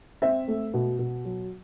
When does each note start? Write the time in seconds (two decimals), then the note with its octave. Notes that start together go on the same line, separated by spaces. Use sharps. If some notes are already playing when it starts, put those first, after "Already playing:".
0.22 C4 E5
0.48 A3
0.74 B2
0.99 B2
1.25 F#3